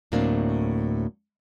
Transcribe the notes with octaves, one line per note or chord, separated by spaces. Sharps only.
D2 A2 F#3 A#3 C4 D4